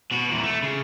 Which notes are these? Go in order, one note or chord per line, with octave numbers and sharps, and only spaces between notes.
B2 F#4
E2 A#2
A3
C#3